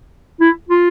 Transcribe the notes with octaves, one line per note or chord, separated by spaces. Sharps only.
E4
F4